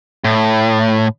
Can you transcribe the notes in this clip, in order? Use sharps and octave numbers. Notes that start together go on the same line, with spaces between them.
A2